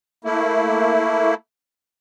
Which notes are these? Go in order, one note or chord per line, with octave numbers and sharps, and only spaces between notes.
A3 A#3 E4